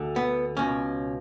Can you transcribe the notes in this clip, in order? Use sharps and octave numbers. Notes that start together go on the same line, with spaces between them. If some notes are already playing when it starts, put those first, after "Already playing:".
Already playing: D2 D3
B3
C#2 B2 C#4